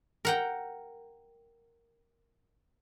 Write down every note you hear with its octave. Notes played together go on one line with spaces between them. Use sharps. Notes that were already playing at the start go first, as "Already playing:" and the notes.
A#4 F#5 G5